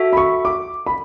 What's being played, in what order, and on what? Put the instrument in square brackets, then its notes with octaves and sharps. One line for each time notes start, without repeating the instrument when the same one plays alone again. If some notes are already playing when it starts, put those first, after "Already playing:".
Already playing: [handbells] F#4 A4 E5
[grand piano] B5
C#6
D6
B5